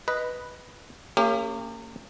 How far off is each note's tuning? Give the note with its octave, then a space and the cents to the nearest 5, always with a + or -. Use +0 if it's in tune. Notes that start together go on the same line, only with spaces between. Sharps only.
B4 +0 D#5 +0
A#3 -35 C#4 +0 G4 +30